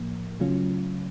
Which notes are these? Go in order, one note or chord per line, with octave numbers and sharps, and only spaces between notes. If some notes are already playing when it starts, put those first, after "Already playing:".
Already playing: A2 F3 A#3
C#3 F#3 A3 C#4 F4